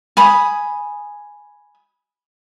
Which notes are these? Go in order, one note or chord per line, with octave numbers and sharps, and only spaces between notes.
G#5 B5 D#6